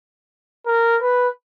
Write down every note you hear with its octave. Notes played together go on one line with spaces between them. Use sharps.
A#4
B4